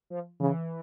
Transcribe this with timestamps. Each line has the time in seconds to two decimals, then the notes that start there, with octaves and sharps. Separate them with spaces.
0.10 F3
0.40 C#3 E3